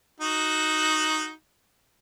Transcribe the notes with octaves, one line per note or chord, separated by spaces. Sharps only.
D#4 F#4